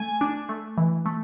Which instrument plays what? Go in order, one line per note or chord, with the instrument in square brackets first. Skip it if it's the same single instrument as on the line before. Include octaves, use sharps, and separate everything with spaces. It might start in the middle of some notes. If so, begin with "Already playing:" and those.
Already playing: [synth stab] A3 G#5
D4
A3
E3
A3